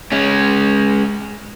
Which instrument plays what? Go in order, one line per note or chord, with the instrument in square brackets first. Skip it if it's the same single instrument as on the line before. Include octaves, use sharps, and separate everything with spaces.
[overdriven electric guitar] G#3 C#4